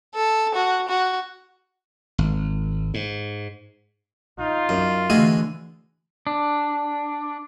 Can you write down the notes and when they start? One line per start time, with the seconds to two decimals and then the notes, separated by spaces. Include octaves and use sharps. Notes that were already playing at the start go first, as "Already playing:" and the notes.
0.15 A4
0.55 F#4
0.89 F#4
2.18 G#1
2.94 G#2
4.40 D#4 F4
4.69 F#2
5.10 D3 E3 A3 F#4 G#4 D#5
6.27 D4